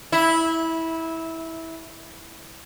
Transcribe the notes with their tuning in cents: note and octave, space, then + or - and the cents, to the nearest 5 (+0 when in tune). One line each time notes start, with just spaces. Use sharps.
E4 -15